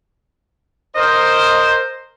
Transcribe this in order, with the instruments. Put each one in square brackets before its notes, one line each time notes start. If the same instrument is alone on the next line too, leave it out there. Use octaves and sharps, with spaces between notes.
[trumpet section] A#4 C5 [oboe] D#5